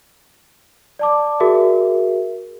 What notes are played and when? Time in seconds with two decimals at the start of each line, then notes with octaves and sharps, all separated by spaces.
0.99 D5 A5 D6
1.40 F#4 G#4 A#4 E5